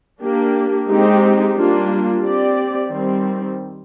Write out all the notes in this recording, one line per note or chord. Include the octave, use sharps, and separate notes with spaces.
A#3 D4 G4
G#3 C4 D#4 G4
G3 A#3 D4 F4
C4 G4 D5
D#3 G3 C4